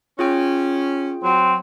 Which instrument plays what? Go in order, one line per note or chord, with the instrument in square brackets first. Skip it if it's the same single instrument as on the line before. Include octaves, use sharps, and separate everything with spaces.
[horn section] C#4 [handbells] F4 G#4 G5
[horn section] F#3 [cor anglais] C4